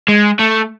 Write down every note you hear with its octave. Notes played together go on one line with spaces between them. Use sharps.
G#3
A3